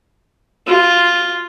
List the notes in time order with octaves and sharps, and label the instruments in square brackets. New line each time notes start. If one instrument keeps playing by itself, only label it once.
[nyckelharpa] F4